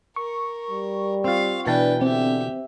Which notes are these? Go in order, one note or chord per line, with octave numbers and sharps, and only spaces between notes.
A#4 C#6
G3
C4 F4 F5
B2 E3 D4 B4 G5 A5
D3 C4 G4 E5